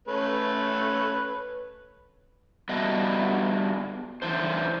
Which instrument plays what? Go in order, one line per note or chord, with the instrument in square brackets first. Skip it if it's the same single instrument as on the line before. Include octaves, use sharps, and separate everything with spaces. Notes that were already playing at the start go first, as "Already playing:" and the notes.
[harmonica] A3 C#4 B4
[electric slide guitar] G3 B3 F#4 A4 D#5 E5
D3 E3 D#4 C5